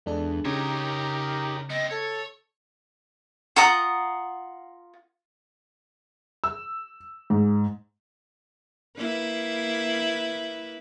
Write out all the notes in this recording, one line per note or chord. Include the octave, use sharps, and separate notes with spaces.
E2 G#3 D4 A4
C#3 D#4 G4 A#4 C#5
B3 C4 D#5
A4 C#5
F4 F#5 A#5 D#6
E6
G#2
A#3 E4 B4